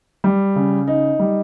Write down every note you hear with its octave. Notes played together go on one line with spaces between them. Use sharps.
G3
C#3
D#4
G3